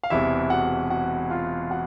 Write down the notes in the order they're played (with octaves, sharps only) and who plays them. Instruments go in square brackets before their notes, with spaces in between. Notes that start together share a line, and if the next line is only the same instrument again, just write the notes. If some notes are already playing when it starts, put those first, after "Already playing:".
[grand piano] F5
E1 E2 C3 E3 E4 E5
F#4 F#5
F#4 F#5
F4 F5
F#4 F#5